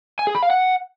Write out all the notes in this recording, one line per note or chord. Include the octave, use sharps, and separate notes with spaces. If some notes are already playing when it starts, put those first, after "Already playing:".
G#5
G#4
B5
F5
F#5